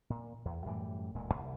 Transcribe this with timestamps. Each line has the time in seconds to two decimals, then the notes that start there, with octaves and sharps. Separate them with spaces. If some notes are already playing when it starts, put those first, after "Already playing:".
0.10 A#2
0.45 E2
0.66 F#2 A2 E3 G3
1.15 E1 D2 A#2 G#3
1.33 C2